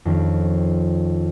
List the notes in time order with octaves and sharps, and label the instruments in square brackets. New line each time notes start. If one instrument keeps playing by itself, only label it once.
[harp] F2 D#3 C#4